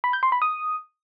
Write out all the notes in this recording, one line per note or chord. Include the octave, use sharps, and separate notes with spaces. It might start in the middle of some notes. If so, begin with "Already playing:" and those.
B5
G6
C6
B5
D#6